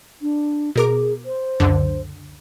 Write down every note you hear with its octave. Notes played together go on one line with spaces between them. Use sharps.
D4
B2 G#4 A#4 D6
C5
C#2 F#2 D3